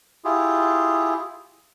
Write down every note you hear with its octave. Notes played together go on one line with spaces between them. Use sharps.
E4 F4 G4 G#4